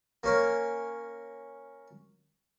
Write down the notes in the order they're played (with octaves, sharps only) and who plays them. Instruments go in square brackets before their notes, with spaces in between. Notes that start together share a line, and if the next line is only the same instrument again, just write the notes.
[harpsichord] A#3 C#4 A#4